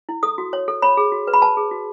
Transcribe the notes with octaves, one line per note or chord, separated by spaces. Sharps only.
E4
A4 D#6
F#4
C#5
A4
C#5 B5
G#4
F#4
B4
B5
B4 A5
G#4
F#4